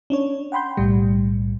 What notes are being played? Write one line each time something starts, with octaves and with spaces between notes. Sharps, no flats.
C#4 D4 C#5
F#5 G5 B5 C6 G6
B1 A2 G3